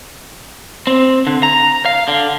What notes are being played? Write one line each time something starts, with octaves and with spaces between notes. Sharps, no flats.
C4
D3
A#5
F5
D3